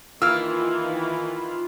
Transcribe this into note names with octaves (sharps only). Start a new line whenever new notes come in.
D#3 E3 A#3 F4 E6 F6